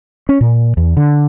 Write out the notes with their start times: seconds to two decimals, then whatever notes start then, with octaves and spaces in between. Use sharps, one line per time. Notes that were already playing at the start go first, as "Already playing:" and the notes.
0.29 C#4
0.41 A#2
0.77 E2
0.97 D3